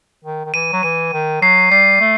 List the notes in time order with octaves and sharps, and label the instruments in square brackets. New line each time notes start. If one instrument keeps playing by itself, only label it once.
[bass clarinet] D#3
D#3
[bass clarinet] E3 [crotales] D#7
[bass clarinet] F#3
[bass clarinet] E3 [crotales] D#7
[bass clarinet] D#3
[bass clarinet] F#3 [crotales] C7
[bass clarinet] G3 [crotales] C7
[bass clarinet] A3